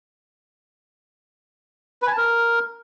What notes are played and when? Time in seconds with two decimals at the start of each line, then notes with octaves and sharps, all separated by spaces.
2.02 B4
2.07 G#5
2.12 A5
2.17 A#4